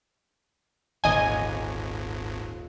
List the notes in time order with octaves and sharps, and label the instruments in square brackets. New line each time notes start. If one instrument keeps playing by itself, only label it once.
[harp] D#1 D#4 [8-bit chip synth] G#1 [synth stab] D#5 G#5